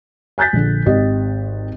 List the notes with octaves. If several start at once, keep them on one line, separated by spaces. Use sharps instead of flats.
G#5 F#6 G6 A6 B6
A#1 D3
G#1 G4 D#5